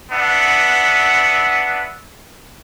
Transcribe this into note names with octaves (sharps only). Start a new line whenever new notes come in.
B3 D4 E5 F#5